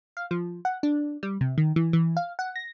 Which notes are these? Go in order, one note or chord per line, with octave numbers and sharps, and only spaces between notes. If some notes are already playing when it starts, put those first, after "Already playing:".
F5
F3
F#5
D4
G3
C3
D#3
E3
E3
F5
F#5
A#6